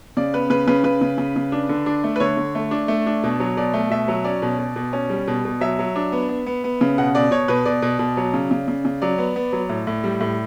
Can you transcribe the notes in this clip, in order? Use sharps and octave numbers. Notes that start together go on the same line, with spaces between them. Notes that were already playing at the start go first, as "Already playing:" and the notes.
C#3 D5
B3 B4
C#3 B4
C#3 B4
C#3 B4
C#3
C#3
C#3
D4
D3
D4
A3
B4
D3 C#5
D3
A3
D4
A3
D4
B2
F#3
B2 D5
A3
B2 E5
F#3
C#4 D5
B2
B2
B2
C#4
G3
B2
B2
F#3 E5
F#3
D4
B3
B3
B3
B3
C#3
B2 F#5
B2 D5
B2 C#5
B2 B4
B2 D5
B2
B2
F#3
C#3
C#3
C#3
C#3
F#3 D5
B3
B3
F#3
A2
A2
G3
A2